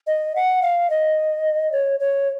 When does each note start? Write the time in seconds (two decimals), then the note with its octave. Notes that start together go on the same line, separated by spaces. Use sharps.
0.07 D#5
0.35 F#5
0.62 F5
0.90 D#5
1.72 C#5
2.00 C#5